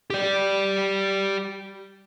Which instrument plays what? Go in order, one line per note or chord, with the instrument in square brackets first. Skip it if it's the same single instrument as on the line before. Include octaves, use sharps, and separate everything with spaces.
[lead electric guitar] G4 D5